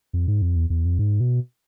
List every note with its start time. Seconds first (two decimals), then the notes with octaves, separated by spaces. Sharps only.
0.13 F2
0.28 G#2
0.42 F2
0.56 E2
0.70 E2
0.85 F2
0.99 G#2
1.20 B2